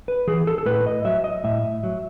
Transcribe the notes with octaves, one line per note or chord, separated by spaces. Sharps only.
B4
E3 G#4
A4
A4
A2 B4
D#5
F#3 E5
D#5
A2 E5
F#3